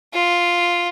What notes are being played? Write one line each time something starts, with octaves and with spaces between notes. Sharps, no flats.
F4